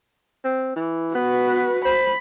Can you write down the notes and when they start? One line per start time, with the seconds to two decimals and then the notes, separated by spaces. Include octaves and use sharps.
0.45 C4
0.76 E3
1.15 B3 F#4 B4
1.85 C5 B5